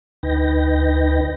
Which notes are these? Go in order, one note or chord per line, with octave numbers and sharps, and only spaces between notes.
D2 D#4 B4 G5 A#6